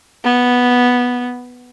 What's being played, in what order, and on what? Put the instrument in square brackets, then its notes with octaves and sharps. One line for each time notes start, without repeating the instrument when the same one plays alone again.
[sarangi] B3